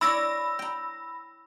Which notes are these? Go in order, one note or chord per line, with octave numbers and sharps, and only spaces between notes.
E4 C#5 D5 B5 E6 A#6
G5 A#5